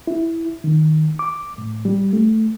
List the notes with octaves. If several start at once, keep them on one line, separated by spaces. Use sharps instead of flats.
E4
D#3
D6
A2
G3
A3